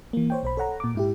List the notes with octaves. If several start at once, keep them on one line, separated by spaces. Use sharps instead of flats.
E3 A#3
C5 C#5 G5
B1 C5 B5
A4 C#5 F#5 A#5
A#2 D6
G#2 E4 G4